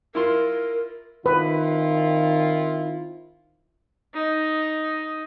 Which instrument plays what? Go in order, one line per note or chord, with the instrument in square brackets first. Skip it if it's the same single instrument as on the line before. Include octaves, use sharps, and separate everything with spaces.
[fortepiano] E4 F4 C6 [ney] A#4
[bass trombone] D#3 [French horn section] C4 E4 F4 [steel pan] B4
[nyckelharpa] D#4